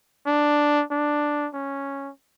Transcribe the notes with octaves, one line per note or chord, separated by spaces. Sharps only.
D4
D4
C#4